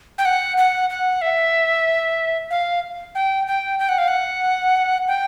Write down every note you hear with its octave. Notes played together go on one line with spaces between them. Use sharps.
G5
F#5
F#5
F#5
E5
F5
G5
G5
G5
F#5
F5
F#5
G5